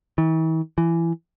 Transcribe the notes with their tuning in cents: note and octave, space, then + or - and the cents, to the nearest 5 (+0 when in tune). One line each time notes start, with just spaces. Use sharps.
E3 -45
E3 +20